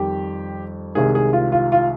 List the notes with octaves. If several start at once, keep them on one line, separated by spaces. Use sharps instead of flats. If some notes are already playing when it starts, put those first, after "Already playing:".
Already playing: F2 D#3 G3 G4
C2 C3 D#3 G#3 G#4
G#4
F4
F4
F4